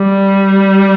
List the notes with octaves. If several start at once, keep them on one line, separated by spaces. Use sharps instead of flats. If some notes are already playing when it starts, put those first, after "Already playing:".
Already playing: G3